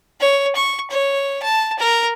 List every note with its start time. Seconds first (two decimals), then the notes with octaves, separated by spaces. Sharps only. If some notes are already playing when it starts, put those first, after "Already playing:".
0.20 C#5
0.55 C#6
0.90 C#5
1.42 A5
1.79 A#4